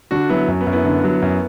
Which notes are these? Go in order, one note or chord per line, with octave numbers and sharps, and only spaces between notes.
D3 D4 F#4
F#3 B3 E4
F#2
B3
F#2
B3 E4
D3
F#3
F#2